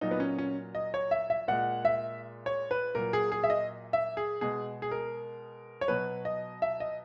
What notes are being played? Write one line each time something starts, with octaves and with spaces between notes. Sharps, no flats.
A#2 F#3 D#4
B3
C#4
C#4
D#5
C#5
E5
E5
A#2 G#3 F#5
E5
C#5
B4
A#2 F#3 A#4
G#4
G#4
E5
D#5
E5
G#4
B2 G#3 G#4
G#4
A#4
C#5
B2 F#3 B4
D#5
E5
D#5